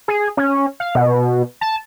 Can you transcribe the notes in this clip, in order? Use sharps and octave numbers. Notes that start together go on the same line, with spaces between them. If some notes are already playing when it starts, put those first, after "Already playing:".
G#4
C#4
F5
B2
A5